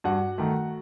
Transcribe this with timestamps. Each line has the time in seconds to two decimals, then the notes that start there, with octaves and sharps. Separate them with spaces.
0.04 G2 F#4 F#5
0.38 D#3 A3